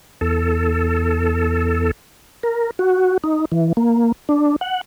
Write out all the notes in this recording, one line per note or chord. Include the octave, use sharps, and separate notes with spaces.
E2 A4
A#4
F#4
D#4
E3
A#3
D4
F#5